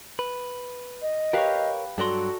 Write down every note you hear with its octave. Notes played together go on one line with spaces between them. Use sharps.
B4
D#5
G4 A#4 B4 C#5 F5
G2 F#3 F#4 A4 D5 A#5 C6